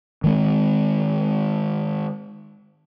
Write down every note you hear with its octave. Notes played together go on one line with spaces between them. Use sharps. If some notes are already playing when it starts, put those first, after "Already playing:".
D#3 G#3 C4